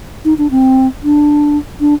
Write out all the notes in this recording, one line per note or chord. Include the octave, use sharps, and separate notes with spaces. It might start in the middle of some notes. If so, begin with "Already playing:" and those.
D#4
D4
C4
D4
D4